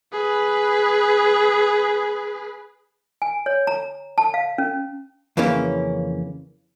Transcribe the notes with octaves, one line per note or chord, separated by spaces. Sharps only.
G#4 B4
G#5
C#5
A#5
A5
F5
C#4
F2 C#3 E3 A#3 C#4